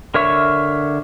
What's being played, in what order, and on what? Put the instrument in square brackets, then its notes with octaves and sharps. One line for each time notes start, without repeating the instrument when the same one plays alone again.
[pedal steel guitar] D3 A#4 C#5 E5 C#6